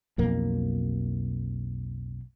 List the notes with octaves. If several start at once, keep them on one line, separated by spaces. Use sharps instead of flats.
B1 F2 A#3